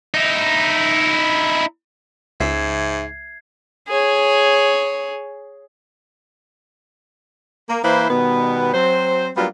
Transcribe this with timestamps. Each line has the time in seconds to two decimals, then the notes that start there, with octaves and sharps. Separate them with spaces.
0.14 D#4 E4
2.40 C#2 G#2 E5 G#6 C7
3.88 G#4 C#5
7.70 A#3
7.84 E3 A#3 E4 B4 C5
8.10 B2 D#3 G3 B3
8.74 F#3 C4 C5
9.37 F#3 G3 A#3 B3 D4 F4